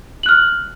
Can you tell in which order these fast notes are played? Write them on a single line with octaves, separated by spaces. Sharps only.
F#7 F#6 F6